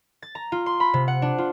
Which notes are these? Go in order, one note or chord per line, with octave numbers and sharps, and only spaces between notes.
A6
A#5
F4
C6
B5
C3
F#5
D4
F4